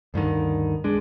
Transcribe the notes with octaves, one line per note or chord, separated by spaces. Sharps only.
D2 G2 D3 D#3
B1 G#3 D4